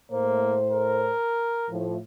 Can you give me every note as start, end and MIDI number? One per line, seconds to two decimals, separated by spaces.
0.12 1.11 45
0.12 0.58 58
0.12 1.11 72
0.72 1.70 70
1.70 1.97 45
1.70 1.97 53